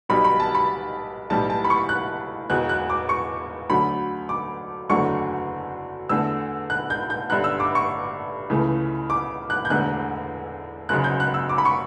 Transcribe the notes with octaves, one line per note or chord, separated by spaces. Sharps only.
B1 B2 G3 B5
B5
A5
B5
B1 A2 E3 G3 A5
A5
B5
C#6
F#6
E1 E2 B2 F#6
F#6
D6
C#6
D2 D3 F#3 A3 B5
D6
F#1 E2 D3 F#3 A3 C#6
E2 D3 A3 E6
F#6
G6
G6
G1 G2 D3 F#6
E6
D6
C#6
C#2 C#3 E3 A3
D6
F#6
G6
E1 E2 D3 A3 F#6
F#1 F#2 C#3 F#6
G6
F#6
E6
D6
B5
C#6